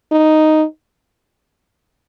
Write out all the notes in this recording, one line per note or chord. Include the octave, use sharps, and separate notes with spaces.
D#4